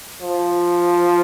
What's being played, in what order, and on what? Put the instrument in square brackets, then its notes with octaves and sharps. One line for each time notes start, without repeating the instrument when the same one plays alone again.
[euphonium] F3